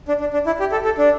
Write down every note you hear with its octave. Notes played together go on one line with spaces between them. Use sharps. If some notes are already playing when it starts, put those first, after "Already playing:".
D4
D4
D4
E4
G4
A4
A4
D4